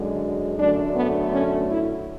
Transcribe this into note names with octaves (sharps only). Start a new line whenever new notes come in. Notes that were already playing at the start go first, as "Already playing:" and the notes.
Already playing: F#2 D3 G#3
F#2 D3 A3 D4
B3
C#4
E4